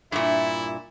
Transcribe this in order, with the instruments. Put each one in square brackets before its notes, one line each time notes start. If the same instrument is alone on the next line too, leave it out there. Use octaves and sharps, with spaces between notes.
[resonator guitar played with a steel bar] G2 A#2 [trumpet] E4 [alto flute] E5